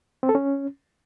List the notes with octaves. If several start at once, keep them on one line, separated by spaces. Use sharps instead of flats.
C4
A4
C#4